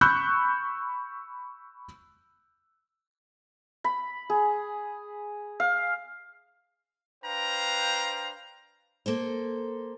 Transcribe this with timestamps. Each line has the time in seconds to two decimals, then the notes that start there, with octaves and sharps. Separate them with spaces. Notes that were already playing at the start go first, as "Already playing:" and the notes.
0.01 B5 C#6 E6 F#6 G6
3.84 B5
4.30 G#4
5.60 F5
7.24 D4 B4 C5 F5 G5 A#5
9.06 A#3 A4 C5